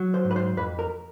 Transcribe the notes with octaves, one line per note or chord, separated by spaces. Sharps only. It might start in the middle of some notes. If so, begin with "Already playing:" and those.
Already playing: F#3
C5
G#2
B4
C5
F2 B4
A#4